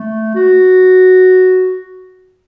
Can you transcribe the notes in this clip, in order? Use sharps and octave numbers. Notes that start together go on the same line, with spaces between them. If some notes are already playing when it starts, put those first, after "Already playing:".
Already playing: A3
F#4